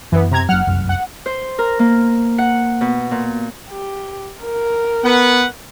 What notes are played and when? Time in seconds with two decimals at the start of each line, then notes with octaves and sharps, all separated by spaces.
0.12 F#2 E3 B3
0.31 C3 A#5 G#6
0.49 F#1 F#3 F#5 F6
0.67 F1 C2 F#2
0.89 F#5
1.26 C5
1.59 A#4
1.79 A#3
2.38 F#5
2.81 B2
3.11 A#2
3.70 G4
4.44 A#4
5.04 B3 B4 F#5